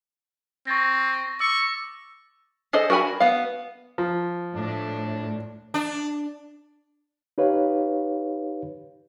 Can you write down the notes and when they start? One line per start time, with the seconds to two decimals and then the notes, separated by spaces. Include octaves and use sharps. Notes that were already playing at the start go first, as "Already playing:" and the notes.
0.67 C4 C#6 A6 A#6
1.40 C#6 D6 E6 A6
2.73 G#4 A4 C5 D#5
2.90 F#4 A#4 G5 G#5 B5
3.20 B3 F5
3.98 F3
4.55 A2 D4
5.74 D4
7.38 D#4 G4 B4 C#5 F5